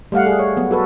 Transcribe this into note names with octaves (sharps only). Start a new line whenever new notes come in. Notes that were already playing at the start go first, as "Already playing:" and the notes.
G3 A3 F5 F#5
G#4
C#5
F#3 B3
F#4 A4 B4